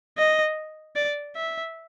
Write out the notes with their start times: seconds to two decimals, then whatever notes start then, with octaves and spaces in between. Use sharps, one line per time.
0.18 D#5
0.96 D5
1.36 E5